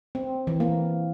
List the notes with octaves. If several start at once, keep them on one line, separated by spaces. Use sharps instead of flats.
C4
E3
A#3